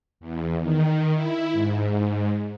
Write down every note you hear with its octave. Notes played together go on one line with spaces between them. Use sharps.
E2
D#3
E4
G#2